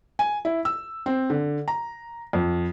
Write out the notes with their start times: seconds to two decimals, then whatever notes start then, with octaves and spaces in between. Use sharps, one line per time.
0.19 G#5
0.45 E4
0.65 E6
1.06 C4
1.30 D3
1.68 A#5
2.33 F2